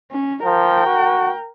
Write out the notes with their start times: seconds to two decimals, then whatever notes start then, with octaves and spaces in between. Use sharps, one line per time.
0.11 C#4
0.45 F3 A#4 G5
0.86 F#4